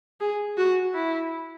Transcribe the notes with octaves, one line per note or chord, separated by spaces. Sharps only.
G#4
F#4
E4